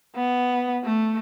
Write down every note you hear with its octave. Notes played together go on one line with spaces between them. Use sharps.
B3
A3